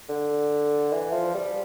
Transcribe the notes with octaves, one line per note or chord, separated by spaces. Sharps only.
D3
E3
F3
G3